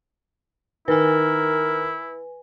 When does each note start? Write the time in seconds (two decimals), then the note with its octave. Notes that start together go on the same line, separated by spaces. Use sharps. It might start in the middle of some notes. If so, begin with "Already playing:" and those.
0.88 D#3 E4 A#4 B4 G#5